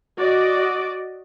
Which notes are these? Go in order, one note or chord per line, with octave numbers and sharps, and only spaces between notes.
F#4 D5 D#5